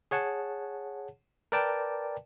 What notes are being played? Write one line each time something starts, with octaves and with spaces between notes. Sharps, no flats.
G#4 C#5 F#5 A5
A#4 B4 D5 G5 A5